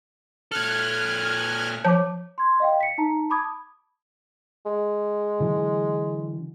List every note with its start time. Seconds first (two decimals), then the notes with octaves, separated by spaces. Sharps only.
0.51 A#2 A4 F6 F#6 G#6
1.85 F3 C#5 A5 D6
2.38 C6 G#6
2.60 D#5 F5 G5
2.80 B6 C#7
2.98 D#4 A5 A#5
3.30 A5 B5 D6 D#6 G#6
4.66 G#3
5.40 D3 E3 F#3